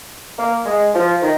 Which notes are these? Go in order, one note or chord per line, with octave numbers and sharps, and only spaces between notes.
A#3
G#3
F3
D#3